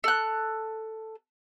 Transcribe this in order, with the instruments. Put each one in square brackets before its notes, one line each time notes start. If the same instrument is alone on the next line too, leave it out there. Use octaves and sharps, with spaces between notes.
[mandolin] A4 F#6